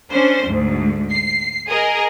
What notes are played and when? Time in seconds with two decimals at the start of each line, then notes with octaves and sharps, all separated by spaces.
0.11 C#4 D4 C5
0.47 D2 G#2
1.11 C7
1.68 G#4 A#4 D#5